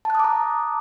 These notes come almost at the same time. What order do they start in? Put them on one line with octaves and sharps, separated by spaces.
A5 F#6 D#6 D6 A#5